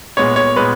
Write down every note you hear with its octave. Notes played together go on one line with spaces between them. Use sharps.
A#2 G#3 B3 C#5
C#5
A#2 G#3 B3 B4